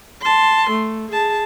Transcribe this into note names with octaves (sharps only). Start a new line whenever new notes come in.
A5 C6
A3
G#4 A5